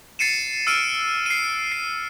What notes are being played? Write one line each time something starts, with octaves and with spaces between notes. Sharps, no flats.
A6 C7 C#7 D#7 E7
E6 F6 D7 D#7
C7 D#7
C7